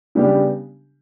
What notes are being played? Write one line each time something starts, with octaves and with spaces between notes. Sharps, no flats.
C#3 G3 B3 D4 G4